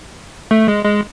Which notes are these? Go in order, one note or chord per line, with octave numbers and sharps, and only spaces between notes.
A3
G#3
G#3